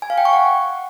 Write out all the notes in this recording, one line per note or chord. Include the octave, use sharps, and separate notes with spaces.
G#5
F5
G5
C#6
F#5